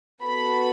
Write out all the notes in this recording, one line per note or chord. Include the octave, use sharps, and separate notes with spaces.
B3 F#4 A4 B5